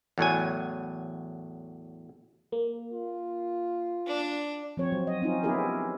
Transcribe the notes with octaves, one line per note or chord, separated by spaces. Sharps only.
E2 A2 F#3 G#5
A#3
F4
D4
F3 C4 C#5
F#3
D#5
C4 C#4 D#4 F4
B3 C#4 E4 G4 G#4 A#4